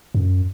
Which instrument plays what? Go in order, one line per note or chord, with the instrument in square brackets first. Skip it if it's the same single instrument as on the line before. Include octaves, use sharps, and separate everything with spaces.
[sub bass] F#2